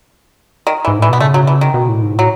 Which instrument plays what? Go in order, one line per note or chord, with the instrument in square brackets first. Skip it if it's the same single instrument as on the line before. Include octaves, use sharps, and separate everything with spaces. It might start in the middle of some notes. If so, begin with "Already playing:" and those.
[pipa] D#3
E3
[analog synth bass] G#2
[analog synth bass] A2 [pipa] E3
[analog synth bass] B2 [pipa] B3
[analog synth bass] C#3 [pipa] A3
[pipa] F#3
E3
D#3
[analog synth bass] B2
A2
G#2
[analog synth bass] A2 [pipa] F#3